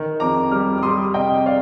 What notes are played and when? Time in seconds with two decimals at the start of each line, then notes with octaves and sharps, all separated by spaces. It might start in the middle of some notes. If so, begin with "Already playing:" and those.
Already playing: D#3
0.20 F2 A#5 D6
0.51 G3 D6 F6
0.78 D6
0.82 G3 C6 D#6
1.14 C3 D#5 G5
1.46 D5 F5